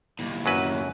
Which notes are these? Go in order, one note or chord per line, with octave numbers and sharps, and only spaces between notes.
D#2 A2
F#2 F#3 B4